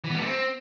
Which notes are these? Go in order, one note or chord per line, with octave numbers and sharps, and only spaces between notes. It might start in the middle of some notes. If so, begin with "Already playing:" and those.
E3
B3
G3
A3
C4